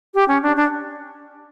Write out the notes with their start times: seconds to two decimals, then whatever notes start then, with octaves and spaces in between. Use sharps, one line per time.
0.15 G4
0.28 C#4
0.43 D4
0.56 D4